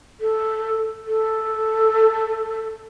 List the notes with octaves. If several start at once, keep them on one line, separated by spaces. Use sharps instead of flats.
A4
A4